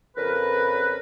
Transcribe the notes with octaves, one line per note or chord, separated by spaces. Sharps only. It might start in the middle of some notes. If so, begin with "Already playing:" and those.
F2 C#3 A#4 B4